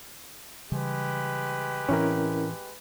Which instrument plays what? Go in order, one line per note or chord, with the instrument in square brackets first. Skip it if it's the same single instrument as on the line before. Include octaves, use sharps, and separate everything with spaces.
[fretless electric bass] C#3 E3 G3 [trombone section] G#3 G4 B4
[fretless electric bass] A2 E3 C4 [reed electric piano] C#4 E4 A#4